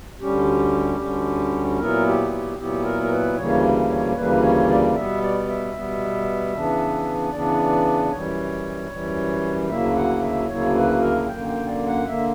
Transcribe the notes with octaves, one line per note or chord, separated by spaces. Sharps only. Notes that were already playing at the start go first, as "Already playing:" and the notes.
D2 D3 G3 C#4 G4
D2 D3 G3 C#4
A#2 F#3 B3 E4 A#4
G4
G4
A#2 F#3 B3 E4 G4
A#4
A#4
B4
D2 C#3 E3 G3 A#3 C#5
C#5
C#5
D2 C#3 E3 G3 A#3 B4
C#5
D5
B2 G3 B3 E5
D5
E5
B2 G3 B3
C#3 E3 B3 D4
C#3 E3 B3 D4 D5
F#2 E3 G3 C#5
F#2 E3 G3
D2 C#3 F#3 A#3 E4 E5
F#5
E5
D2 C#3 F#3 A#3 E4 C#5
B4
A#4
F#2 D3 A#3 G5
G5
D5
F#5
D3 A#3 E5